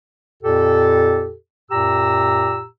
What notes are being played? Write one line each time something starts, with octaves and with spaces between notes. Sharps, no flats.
F2 A#2 G4 A4
F#2 A#2 G4 A#5 E6